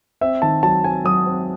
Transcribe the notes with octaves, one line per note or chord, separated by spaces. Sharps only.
C4 E5
D#3 A5
F#3 A5
C4 G#5
F#3 D#6
C4